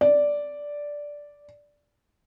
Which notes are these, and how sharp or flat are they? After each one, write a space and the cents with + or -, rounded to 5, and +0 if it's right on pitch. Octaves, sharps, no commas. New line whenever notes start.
D5 -5